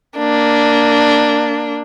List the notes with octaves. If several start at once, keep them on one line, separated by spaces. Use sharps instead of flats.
A#3 D4